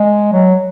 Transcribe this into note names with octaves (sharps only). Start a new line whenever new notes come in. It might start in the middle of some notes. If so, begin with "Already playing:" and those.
Already playing: G#3
F#3